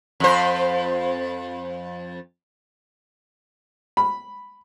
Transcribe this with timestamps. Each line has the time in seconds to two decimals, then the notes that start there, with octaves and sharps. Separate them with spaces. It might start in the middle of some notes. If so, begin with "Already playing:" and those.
0.20 F2 C5
3.97 B5